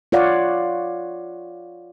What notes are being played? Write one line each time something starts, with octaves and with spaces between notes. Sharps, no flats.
F4 C#5 D5 F5 F#5